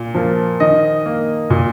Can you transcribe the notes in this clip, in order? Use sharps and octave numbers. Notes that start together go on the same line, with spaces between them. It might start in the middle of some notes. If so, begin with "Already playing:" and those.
Already playing: A#2
F3 A#3
D#3 D#5
A#3
A#2